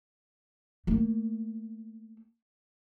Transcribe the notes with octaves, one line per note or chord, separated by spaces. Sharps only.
A3 A#3